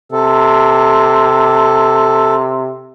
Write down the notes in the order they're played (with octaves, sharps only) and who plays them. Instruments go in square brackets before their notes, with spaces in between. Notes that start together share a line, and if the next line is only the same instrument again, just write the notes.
[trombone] C3 [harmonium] A4